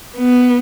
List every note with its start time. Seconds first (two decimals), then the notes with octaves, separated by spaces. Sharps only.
0.17 B3